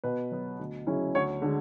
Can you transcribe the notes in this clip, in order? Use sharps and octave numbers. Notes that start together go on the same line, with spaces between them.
B2 B4
F#3 B3
D2
C#3 F#3 C#4 E4
D2 C#5
D3 G#3